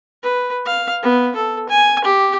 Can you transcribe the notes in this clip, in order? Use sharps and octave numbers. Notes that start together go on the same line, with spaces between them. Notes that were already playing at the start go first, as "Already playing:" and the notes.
B4
F5
B3
A4
G#5
G4